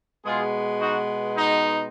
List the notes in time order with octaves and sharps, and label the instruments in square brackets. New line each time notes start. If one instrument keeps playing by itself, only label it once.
[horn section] B2 G#3 B3 F4 G#4
D#4 F#4
D#4